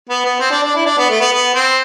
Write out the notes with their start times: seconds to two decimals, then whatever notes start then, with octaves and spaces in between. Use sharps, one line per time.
0.09 B3
0.25 B3
0.40 C4
0.51 D4
0.63 D4
0.75 E4
0.86 D4
0.98 B3
1.10 A3
1.20 B3
1.33 B3
1.54 C4